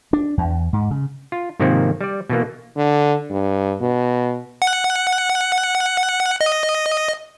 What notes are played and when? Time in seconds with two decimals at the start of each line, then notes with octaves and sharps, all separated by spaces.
0.13 D4
0.38 E2
0.73 G#2
0.91 C#3
1.32 F4
1.60 G#2 C3 D#3 F3 A#3 C4
2.01 G3 D5
2.30 B2 E3 A#3
2.76 D3
3.30 G2
3.81 B2
4.62 F#5
6.41 D#5